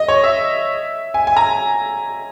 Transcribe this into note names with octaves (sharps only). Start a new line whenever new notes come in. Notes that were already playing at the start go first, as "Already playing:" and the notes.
Already playing: D#5
C#5
E5
G#5
G#5
A#5